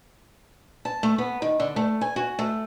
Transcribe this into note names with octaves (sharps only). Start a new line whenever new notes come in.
A5
A3
B3
D#3
D3
A3
G#5
F#4
A3